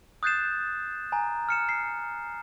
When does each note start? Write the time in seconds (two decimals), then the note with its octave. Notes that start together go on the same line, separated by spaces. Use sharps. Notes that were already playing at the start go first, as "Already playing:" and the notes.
0.23 D#6 F#6 G6 A6 C7 E7
1.12 G#5 A#5
1.49 F6 C#7 E7
1.69 C7